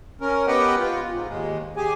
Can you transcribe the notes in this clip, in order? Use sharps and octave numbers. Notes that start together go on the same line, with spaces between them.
C#4 A#4
B3 G4 B4 D#5 F#5 G5
F4
G#2
D#2 G#3
G4 G#4 G#5